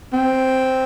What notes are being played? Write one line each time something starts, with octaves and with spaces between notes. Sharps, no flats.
C4